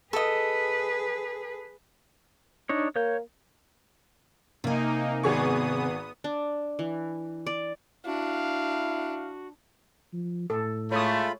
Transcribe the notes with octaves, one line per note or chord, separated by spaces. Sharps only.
G#4 A4 B4 D#5
D4 D#4 C#5
A#3 C#5 G6
C3 A#3 D#4 G#5
G#1 B3 G#4 C#6 D#6
D4
E3
D5
D4 E4 F#4 F5
F3
A2 A4
G#3 A3 F4 C#5 B5 D#6